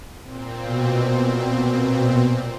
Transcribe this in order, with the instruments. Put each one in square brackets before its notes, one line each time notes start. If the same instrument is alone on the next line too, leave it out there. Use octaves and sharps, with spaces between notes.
[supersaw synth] A#2 C4
[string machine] B2